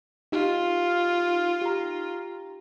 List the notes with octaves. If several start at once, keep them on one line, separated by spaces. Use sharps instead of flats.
D#4 F4 G4
G4 A#5